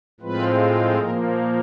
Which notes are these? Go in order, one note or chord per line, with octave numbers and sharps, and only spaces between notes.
A2 F3 G#3 C4 F4 B4
A#2 F3 A#3 A#4